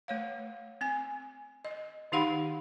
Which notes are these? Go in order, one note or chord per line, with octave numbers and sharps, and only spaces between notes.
A3 C#5 F5
C4 G#5
D#5
D#3 D#4 G4 F5 F#5 B5